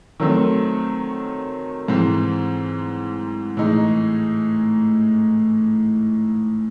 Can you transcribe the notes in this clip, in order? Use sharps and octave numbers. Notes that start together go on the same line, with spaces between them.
D#3 F#3 A3 C4
G#2 E3 C4
A2 E3 G#3 D#4